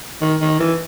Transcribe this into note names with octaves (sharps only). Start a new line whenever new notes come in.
D#3
D#3
E3